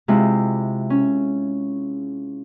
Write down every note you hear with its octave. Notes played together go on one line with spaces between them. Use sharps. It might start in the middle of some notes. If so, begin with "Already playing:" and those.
C3 G#3 E4 F4
C#4